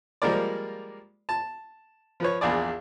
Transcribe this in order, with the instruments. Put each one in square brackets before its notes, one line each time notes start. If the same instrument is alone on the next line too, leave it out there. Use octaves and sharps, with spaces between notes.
[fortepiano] F3 G3 G#3 A#3 A#4 D5
A5
F3 B4 C#5
A#1 E2 G#4 D5